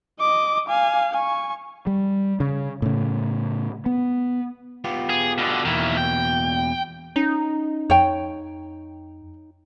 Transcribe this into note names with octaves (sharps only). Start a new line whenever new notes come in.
D#5 D6
F5 G#5
G#5 C#6
G3
C#3
A2 C#3
B3
B3 F4 G4
G#4
B2 D3
E2 B2 D#3 A#3 E4
G5
C#4 D#4
F2 C#5 G5